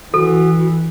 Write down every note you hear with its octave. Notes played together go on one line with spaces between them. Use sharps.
E3 F#4 A4